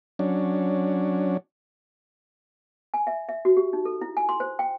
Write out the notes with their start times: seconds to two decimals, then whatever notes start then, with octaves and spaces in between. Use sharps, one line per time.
0.19 F#3 C#4 D4
2.94 G#5
3.07 E5
3.29 E5
3.45 F#4
3.57 G4
3.73 D#4
3.85 A4
4.01 E4
4.17 G#5
4.29 C6
4.40 C5
4.59 G5